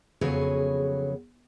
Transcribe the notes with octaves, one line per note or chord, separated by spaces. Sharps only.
F2 C#3 F#3 B3 G#4 C#5